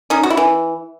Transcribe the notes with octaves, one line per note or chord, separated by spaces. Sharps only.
C#4 D#4
F#4
E4
E3